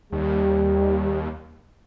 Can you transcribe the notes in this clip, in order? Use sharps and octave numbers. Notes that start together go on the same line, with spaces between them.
D#2 G3